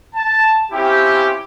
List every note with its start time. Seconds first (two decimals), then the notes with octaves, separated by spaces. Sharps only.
0.15 A5
0.72 C4 C#4 E4 F4 G4